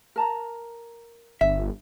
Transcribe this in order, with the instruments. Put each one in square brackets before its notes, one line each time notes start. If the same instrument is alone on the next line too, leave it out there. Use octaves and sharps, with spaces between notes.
[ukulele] A#4 A5 A#5
[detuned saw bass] G1 [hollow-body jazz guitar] E5